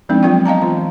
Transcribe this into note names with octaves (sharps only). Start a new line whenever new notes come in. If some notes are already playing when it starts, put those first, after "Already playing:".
F3 G#3 B3 C4 D4 D#4
F#3 B3 F4 D5 G5
D#5 F5 A5 A#5
E3 F4